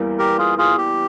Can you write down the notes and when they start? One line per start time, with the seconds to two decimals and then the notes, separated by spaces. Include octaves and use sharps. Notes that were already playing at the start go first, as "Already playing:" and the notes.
Already playing: E2 E3 G3 A#3
0.18 G4 A#4
0.38 F4 G#4
0.58 F4 G#4
0.78 G4